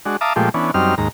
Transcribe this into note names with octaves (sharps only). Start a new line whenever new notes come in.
G#3 D4 F#4
E5 F5 A5 A#5 D6 D#6
A#2 F3 G#3 A3 G4
E3 B3 C#4 D4
F#2 G3 C4 D#4 F6
D#2 G#2 A#5